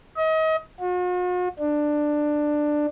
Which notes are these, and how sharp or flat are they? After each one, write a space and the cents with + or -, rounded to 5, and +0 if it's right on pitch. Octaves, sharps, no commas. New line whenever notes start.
D#5 +35
F#4 -45
D4 +15